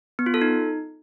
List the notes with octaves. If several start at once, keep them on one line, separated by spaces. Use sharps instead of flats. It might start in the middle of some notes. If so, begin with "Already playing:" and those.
B3
F4
A4
D#4